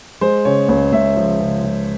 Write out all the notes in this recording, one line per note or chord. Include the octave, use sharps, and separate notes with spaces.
G#3 C5
C#3 C#5
C#2 C#5
C#2 E5
F3
C#3
F3